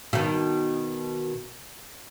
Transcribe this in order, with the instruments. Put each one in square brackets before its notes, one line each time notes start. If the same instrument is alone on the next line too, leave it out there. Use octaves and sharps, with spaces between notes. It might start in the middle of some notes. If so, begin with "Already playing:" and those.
[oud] B2 D#3